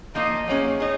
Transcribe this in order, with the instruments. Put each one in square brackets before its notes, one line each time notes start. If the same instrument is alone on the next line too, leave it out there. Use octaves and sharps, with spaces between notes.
[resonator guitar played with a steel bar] F3 A#3 D#4 [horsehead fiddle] D#5
[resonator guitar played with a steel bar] F#3 A#3 C#4 G#4 [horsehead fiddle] C#5
[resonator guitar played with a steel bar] D#4 G#4